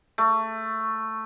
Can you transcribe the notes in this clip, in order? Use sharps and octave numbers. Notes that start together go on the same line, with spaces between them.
A3